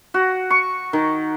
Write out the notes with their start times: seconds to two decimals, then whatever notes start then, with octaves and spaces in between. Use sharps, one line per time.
0.14 F#4
0.50 C#6
0.93 D#3